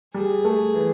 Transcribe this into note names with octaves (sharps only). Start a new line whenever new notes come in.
G3 G#4
A3
E3